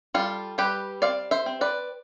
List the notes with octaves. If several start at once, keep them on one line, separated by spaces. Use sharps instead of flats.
G3 F4 A4
G3 G4 B4
C4 D5 F5
C5 E5
C4
B4 D5